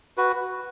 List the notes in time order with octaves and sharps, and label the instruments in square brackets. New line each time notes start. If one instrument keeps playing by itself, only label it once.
[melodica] F#4 B4